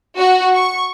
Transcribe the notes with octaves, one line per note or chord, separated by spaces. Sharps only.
F#4
C#6